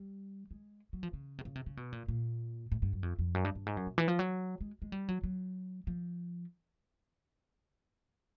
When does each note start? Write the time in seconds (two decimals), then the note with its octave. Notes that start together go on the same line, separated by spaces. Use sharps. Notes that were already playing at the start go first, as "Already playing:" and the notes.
Already playing: G3
0.51 G#3
0.93 F#3
1.03 F3
1.13 C#3
1.38 C3
1.45 C#3
1.55 C3
1.66 C#3
1.77 B2
1.92 A#2
2.08 A#2
2.72 A2
2.82 G2
2.93 F#2
3.03 F2
3.19 F2
3.35 F#2
3.45 G2
3.55 G2
3.66 G#2
3.77 F#2
3.86 B2
3.98 E3
4.08 F3
4.19 F#3
4.61 G#3
4.82 G#3
4.92 G3
5.09 F#3
5.24 F#3
5.87 F3